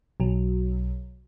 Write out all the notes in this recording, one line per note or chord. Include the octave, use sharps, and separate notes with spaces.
B1 F#3